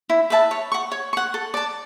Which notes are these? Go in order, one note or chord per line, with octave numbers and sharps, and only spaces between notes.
E4
B4 E5 A5
C#5
F#5 C#6
C#5
F#5 C#6
A4
D5 A5